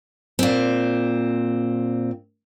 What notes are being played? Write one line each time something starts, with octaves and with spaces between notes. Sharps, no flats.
A#2 C4